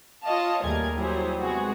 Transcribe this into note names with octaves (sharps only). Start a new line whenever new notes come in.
F4 C#5 D#5 F5 A5
D#2 G3 A3 G#4 A#4 G#6
F#3 G3 E4 G#4 C5
C3 G#3 B3 F#4 G#4